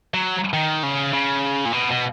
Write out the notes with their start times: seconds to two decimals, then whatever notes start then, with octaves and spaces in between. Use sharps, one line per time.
0.14 F#3
0.53 D#3
0.83 C#3
1.13 C#3
1.65 A#2
1.73 B2
1.91 B2